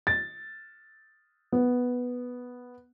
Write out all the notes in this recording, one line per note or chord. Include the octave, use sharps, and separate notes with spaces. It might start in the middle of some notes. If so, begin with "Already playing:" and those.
A6
B3